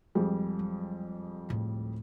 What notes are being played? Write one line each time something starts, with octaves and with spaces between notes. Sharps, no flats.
F2 G3 G#3
F#3
D2 A2